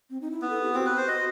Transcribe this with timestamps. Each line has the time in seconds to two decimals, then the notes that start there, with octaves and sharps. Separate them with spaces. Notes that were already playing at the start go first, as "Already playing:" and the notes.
0.10 C4
0.21 D#4
0.31 E4
0.42 B3
0.50 A4
0.62 G4
0.74 C4 F#4
0.86 B4
0.97 C5
1.08 D#5